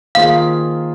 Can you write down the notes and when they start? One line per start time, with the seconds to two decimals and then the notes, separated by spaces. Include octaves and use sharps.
0.15 D#3 A#3 F4 G#4 C5 F5